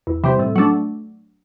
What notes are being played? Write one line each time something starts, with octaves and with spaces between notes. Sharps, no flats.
E2
C3 E3 G3 C4
A2
F#3 A3 D4